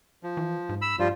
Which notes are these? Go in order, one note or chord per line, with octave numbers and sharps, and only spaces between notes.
F3
E3
G#2
B5 E6
G2 F3 G3 F4